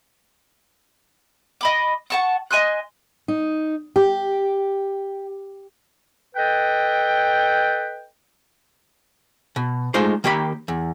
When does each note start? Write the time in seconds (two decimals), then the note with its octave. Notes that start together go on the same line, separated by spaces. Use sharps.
1.61 D#5 B5 D6
2.10 F#5 A5 C#6
2.51 D#5 G#5 C6 F#6
3.28 D#4
3.96 G4
6.36 A4 B4 D#5 G5
9.56 B2
9.94 G#3 A3 D#4 F4 C5 D5
10.24 D#3 A#3 G4 F5 B5
10.68 E2